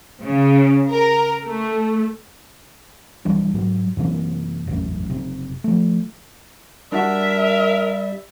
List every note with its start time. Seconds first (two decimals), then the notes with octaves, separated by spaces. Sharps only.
0.21 C#3
0.92 A#4
1.45 A3
3.25 B1 E3 G3 D4
3.54 G#2 F#3
3.97 F#2 C3 E3 A#3
4.67 E1 A1 F#2
5.10 F#1 C3
5.64 F3 A3
6.92 G3 D4 F#4 A#4 E5